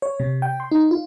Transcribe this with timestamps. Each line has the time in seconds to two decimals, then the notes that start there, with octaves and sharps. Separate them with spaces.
0.02 C#5
0.20 C3
0.42 G5
0.60 C6
0.72 D#4
0.91 F4